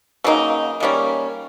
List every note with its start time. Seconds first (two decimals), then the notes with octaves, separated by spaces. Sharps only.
0.24 C#3 F#3 A#3 D#4
0.80 D#3 G3 A#3 C#4